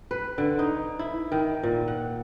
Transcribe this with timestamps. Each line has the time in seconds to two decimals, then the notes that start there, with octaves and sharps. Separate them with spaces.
0.11 B4
0.38 D3
0.59 D#4
0.99 E4
1.32 D#3
1.63 A#2
1.88 F#5